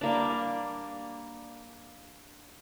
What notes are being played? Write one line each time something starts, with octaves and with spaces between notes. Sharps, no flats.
G3 A#3 D4